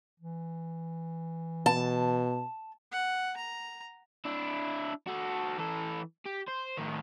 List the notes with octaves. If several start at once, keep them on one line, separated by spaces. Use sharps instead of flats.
E3
B2 A5
F#5
A#5
D4 E4
F#4 A4
E3 A4
G4
C5
A2 D#3